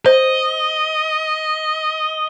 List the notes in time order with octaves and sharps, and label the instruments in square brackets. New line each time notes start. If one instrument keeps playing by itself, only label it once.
[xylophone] C5 [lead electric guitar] D#5